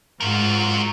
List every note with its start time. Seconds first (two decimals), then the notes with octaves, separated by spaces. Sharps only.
0.21 G#2 F4 F#4 A#4